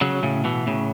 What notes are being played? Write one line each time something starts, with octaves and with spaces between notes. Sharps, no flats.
C#3 F#3
A2 C#3
B2 E3
A2 C#3